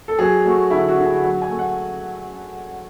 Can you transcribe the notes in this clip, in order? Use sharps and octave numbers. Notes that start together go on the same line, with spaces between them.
A4
F#3 G#4
A3 F#4
D3 E4
F#4
D3
G#4
F#3 F#5
G#5
A3
F#5